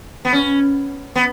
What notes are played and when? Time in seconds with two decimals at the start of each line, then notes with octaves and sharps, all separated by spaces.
0.25 B3
0.33 C#4
1.15 B3